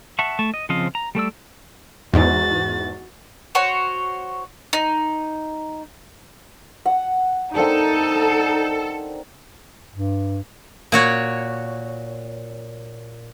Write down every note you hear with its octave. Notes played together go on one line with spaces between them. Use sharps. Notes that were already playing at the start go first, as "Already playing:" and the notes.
E5 F#5 A5 C#6
A3 A5 C#6
D#5
C#3 F3 C4 D#5 F5
A#5
G3 A3 D5 E6
E2 G#2 F#4 A6
F#4 C5 C#5
D#4
F#5
A#3 C4 D4 D#4 A4
G2
A#2 F#4 C#5